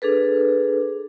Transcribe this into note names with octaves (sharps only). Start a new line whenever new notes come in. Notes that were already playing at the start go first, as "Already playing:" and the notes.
D4 G#4 A4 B4